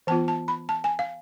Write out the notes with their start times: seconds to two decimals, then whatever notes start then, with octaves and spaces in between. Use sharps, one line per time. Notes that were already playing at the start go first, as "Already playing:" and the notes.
0.07 E3 B3 F4 A5
0.28 A5
0.48 B5
0.69 A5
0.84 G#5
0.99 F5